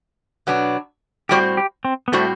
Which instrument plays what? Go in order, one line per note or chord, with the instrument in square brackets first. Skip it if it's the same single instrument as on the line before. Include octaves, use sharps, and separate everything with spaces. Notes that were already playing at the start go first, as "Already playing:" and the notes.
[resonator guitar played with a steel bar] B2 F#3 B3 D4
[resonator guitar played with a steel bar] A2 G3 C4 F#4 C5 [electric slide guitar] G4
[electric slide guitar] G4
C4
B3
[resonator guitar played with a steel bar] A2 G3 C4 F#4 C5 [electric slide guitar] A3